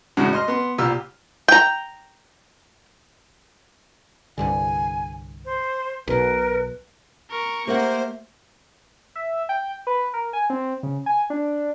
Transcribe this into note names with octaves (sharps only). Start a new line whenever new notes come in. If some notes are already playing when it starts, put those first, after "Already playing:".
E2 A2 C#3 G#3 F#4
D#5 C6 F6
B3 C6
C2 A#2 G4 E6 F6
G5 A#5
C2 G2 D3 G#5
C5
B1 B2 A#4 B4
A#4 C#6
A3 A#3 G4 A#4 C5 F#5
E5
G5
B4
A#4
G#5
C4
C#3
G#5
D4